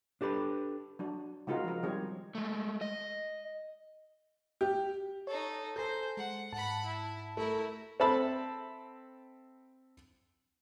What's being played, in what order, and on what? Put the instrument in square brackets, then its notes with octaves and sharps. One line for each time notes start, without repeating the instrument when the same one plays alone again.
[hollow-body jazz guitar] D4 G4 A4 B4
[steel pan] F#3 D4
C#3 G#3 D#4 F4 F#4 A#4
F3 A#4
D#3 G3 G#3 C4 G#4 C#5
[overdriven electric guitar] G#3 A3
D#5
[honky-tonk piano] G4
[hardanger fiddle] D#4 A4 [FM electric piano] C#5
[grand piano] A4 [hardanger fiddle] C5 [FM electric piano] G#5 A#5 G6
[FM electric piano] G#3 [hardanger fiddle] F#5
[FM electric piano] G#2 A5 [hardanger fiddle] F#5 B5
[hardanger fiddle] E4
[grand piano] A3 [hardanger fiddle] E4 A#4
[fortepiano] C4 A4 E5 A5 B5